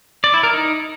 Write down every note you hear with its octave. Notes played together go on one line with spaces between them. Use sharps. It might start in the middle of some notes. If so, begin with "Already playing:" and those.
D5
E4
A#4
D#4